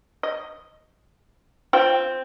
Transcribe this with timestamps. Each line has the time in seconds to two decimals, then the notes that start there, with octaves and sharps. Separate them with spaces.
0.23 D#5
1.73 C4 F4 C5 G5